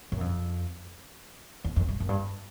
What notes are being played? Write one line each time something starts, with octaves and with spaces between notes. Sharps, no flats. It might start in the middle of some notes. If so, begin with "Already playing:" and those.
F#2
F2
E2
F2
G2
F#2
G2